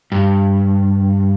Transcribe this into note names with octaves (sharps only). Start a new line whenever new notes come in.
G2